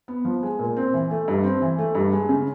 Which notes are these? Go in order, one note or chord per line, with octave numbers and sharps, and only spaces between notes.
B3
F3
G#3
A#2
C4
E3
A3
G2
C4
E3
A3
G2
G#3
C#3